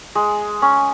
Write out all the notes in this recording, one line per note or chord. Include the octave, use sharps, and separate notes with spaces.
G#3
C#4